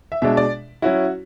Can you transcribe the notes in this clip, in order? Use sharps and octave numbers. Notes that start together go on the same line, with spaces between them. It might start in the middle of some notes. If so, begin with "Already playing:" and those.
E5
B2 G#3 D4 E5
D5
F#3 C#4 E4 F#4